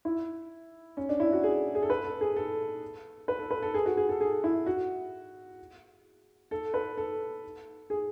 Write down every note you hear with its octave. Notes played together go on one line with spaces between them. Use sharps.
E4
C#4
D4
E4
F#4
G#4
G#4
A4
B4
A4
G#4
A4
B4
A4
B4
A4
G#4
F#4
G#4
A4
G#4
E4
F#4
A4
B4
A4
G#4